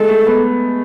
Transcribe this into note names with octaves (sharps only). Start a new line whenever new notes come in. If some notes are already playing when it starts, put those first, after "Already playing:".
Already playing: G#3 A4
A3
B3